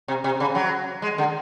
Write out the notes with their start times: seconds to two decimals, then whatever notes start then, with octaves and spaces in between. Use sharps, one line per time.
0.08 C3
0.24 C3
0.40 C#3
0.55 F#3
1.02 G#3
1.18 D3